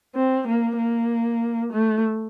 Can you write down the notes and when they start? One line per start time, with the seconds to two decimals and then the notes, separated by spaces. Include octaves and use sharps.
0.15 C4
0.47 A#3
0.78 A#3
1.73 A3